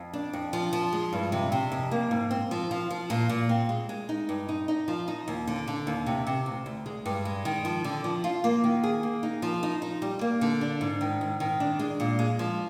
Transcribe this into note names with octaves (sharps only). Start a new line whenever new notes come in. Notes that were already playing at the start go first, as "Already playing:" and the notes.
Already playing: F2
D4
F2
F3
F3
G#3
G2
C3
C3
F2
A#3
G#2
C4
F3
F3
F3
A#2
A#2
C4
G#3
G#3
D#4
G2
D#4
D#4
F3
D#4
D#2
D3
D3
D#2
C3
C3
D2
D2
G#3
G2
G#3
D#3
F3
D3
F3
F4
A#3
D#3
G#4
A#3
D#4
F3
D#4
D#4
G3
A#3
D3
D4
G#2
D#3
G#2
D#3
D4
G#3
A#2
G#3
F3